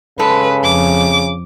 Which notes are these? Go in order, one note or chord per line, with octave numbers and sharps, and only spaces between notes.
C#3 G#3 A4 B4
F2 D6